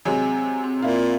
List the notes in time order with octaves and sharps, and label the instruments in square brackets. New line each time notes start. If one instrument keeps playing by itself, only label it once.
[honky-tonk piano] C3 F#3 G#3 [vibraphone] C4 G#5
[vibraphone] C4
[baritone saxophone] A#2 [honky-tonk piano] E4 F4